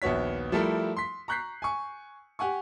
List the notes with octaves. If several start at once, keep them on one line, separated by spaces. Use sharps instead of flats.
A#1 D#2 B3 F#4 C#5 B6
F3 G3 A3 E4 A4 A#4
C6 B6
A#5 C#6 F#6 G6 B6 C7
G#5 C#6
G4 F#5 G#5 C#6